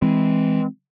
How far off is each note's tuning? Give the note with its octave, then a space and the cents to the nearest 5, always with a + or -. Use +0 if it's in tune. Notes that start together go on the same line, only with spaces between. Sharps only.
E3 -10 G#3 +0 C4 -5